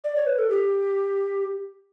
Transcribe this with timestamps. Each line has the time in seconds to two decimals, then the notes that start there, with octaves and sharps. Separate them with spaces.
0.04 D5
0.16 C#5
0.27 B4
0.39 A4
0.50 G4